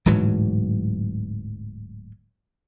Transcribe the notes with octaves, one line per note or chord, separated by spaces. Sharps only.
D1 G#2 E3 F#3